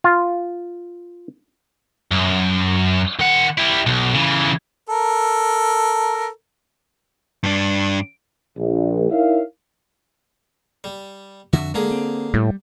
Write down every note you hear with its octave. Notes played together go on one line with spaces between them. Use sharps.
F4
F#2
D#3 F#5
G3 E4
B1
C#3 E3
A4 A#4
G2 D4
A#1
D#4 E4 A#4 C#5 E5 F5
G3
F2 D3 F#4 E5
D3 G#3 A#3 G#4
C4
A2 G3